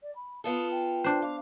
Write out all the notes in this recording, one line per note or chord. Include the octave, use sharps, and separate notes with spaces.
D5
B5
B3 F4 A4 D#6
G5
D4 C5
F5 D6